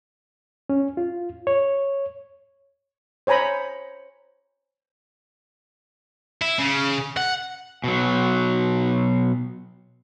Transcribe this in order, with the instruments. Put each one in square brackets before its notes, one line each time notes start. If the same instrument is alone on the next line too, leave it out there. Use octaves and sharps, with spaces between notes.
[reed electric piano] C#4
F4
C#5
[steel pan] C5 C#5 G#5 A#5 B5
[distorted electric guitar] E4
C#3
F#5
[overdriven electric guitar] B2 F#3